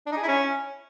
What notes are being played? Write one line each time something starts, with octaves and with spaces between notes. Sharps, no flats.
D4
D#4
G#4
E4
C#4